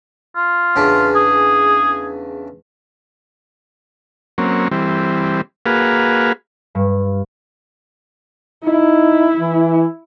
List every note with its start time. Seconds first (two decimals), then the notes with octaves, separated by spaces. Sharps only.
0.36 F4
0.76 E2 C#3 D4
1.15 G#4
4.38 F#3 A#3 C4 C#4
4.71 E3 G3 C4
5.66 A#3 F#4 G#4 B4 F5
6.75 G2
8.64 D#4 E4
9.39 E3